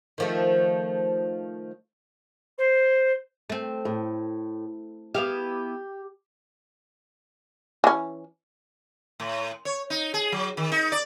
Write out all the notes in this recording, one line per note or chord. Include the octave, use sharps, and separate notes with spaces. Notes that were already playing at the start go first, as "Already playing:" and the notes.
D#3 F3 A3
C5
A3 C4
A2
B3 E4 G4 F5
E3 C#4
A2
C#5
D#4
G#4
F#3
D#3
D#4
D5